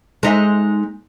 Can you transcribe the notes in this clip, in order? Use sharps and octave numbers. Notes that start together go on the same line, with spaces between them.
G#3 D#4 E5